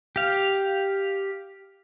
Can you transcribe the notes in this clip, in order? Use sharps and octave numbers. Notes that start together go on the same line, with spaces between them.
G4 F5